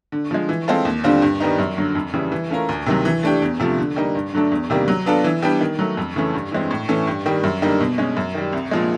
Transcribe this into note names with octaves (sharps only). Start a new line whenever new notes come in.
D3
F3 G#3
E3
G#3 C4 F4 A4
D#2
D3 G3 C4 F4
G2
D#3 G3 B3 D#4
F#2
D3 F#3
F2
C#3 E3 G3
E3
A3 C#4 F4 A#4
D2
C3 D#3 F#3
E3
A3 D4 G4
E2
C3 F3 A3
D3
G3 A#3 D#4
G2
D3 F#3 A3 D4
E2
C3 D#3 G3 A#3
F#3
B3 D4 F4 A4
E3
G3 B3 D4 G4
D#3
F#3 A3
F2
C#3 E3 A3 C#4
G2
E3 G#3 C4
A2
E3 A3 C#4
G2
D#3 G3
F#2
D3 G3 A#3 D#4
B2
G#3 C#4
F#2
D#3 G3
C2
A#2 F3 G#3